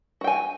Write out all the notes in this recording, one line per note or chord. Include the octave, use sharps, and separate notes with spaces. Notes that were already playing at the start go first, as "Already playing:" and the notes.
F#4 G5 G#5